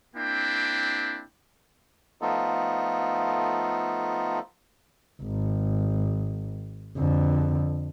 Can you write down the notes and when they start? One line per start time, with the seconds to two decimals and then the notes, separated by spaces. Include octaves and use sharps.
0.16 A#3 C4 D4 E4 G5
2.22 F3 A3 B3 D#4 F4 A4
5.22 G#1
6.97 F2 D3